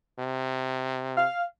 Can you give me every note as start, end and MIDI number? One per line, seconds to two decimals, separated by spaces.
0.20 1.26 48
1.15 1.42 77